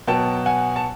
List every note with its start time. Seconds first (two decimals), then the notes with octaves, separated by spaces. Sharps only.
0.08 B2 F#3 B3 G5 A5
0.46 F#5 G#5
0.76 A5